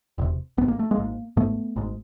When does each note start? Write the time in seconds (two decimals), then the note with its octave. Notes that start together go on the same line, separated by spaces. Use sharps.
0.18 E1 E2 C3
0.57 G#1 G#2 B3
0.68 A#3
0.79 A3
0.91 G#3 A#3
0.97 G#1 G#2
1.37 G#1 G#2 A3 B3
1.76 G#1 G#2